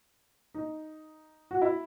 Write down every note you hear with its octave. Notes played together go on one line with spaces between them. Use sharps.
D#4
F#4
E4